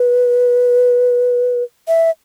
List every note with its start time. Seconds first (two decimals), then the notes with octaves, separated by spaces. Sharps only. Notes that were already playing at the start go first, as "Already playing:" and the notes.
Already playing: B4
1.88 E5